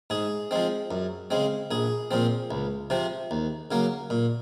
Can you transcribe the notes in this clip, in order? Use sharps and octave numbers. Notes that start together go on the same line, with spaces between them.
G#2 G#4
F3 G#3 C4
F#2
C#3 G#3 C4
A#1 G#4
A#2 F3 C4
C#2
C3 F3 C4
D#2
C#3 F#3 A#3
A#2